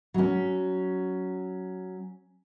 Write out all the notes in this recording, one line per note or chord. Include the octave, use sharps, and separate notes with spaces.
F#3 C#4